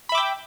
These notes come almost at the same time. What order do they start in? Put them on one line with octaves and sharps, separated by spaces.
B5 E5 D6 G5